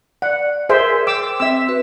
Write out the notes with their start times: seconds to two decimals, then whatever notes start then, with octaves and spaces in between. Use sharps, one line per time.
0.22 D5 F#5
0.69 G#4 A#4 C5 E5
1.07 G5 D6 E6
1.40 C4 E5 E6
1.67 C4 F#4 B4